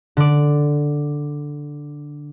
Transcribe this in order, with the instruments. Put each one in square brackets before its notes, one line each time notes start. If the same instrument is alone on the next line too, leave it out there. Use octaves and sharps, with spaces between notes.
[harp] D3 D5